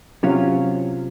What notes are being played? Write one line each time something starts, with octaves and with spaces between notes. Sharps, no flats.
C3 F#3 C#4 F4